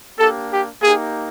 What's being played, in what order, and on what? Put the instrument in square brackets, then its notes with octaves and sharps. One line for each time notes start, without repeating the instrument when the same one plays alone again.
[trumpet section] A#3 D4 G4 A4
G4
A#3 D#4 G4 G#4